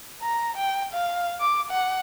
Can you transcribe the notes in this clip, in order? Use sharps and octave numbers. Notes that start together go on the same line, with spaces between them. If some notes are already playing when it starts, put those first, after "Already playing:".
A#5
G5
F5
D6
F#5